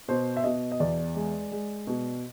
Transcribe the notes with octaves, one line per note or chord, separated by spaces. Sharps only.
B2 C5
E5
B2 D#5
D#5
E2 D5
G#3
G#3
B2